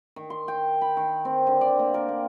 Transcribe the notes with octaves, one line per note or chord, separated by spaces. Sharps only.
D#3
C6
G5
B5
D#3
C4
D3
D5
A#3
A#4
A#3